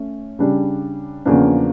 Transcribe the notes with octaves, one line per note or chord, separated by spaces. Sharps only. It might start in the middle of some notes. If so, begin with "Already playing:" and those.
Already playing: A3 C#4
C#3 G3 D4
E2 C#3 F3 A#3 D4